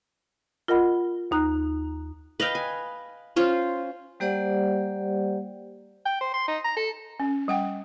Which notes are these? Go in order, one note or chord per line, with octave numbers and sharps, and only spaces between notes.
F4 A#4 D#5 F#5 B5
D#2 D#4 A#5 F#6
B4 D#5 F5 G5
G#5
C#4 F4 C5
G3 A#3 G4 C5 D5 F#5
G5
C5
C6
D#4
A#5
A4
C#4
G3 F#5 G5